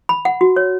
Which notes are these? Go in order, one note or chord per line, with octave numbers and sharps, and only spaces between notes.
B5
F#5
F#4
C#5